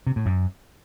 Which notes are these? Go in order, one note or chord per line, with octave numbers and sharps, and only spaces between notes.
C3
A2
F#2